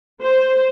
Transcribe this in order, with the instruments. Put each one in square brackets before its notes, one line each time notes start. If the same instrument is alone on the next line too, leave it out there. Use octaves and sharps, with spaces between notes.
[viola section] C5